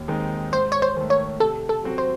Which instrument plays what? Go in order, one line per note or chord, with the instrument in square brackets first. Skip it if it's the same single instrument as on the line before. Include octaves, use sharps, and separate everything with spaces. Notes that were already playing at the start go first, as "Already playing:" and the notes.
Already playing: [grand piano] D#2
D#3 G#3 C4 D#4
[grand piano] G#2 [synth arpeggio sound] C5
[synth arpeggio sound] C#5
C5
[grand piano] D#3 A3
[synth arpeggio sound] C#5
[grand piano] C3 [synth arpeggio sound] A4
[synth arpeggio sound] A4
[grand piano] F#3 C4 F#4
[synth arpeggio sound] C5